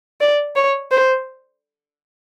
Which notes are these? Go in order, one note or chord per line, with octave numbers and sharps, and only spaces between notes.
D5
C#5
C5